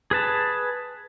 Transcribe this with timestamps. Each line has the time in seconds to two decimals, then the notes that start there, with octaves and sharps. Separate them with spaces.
0.11 G#4 B4 A5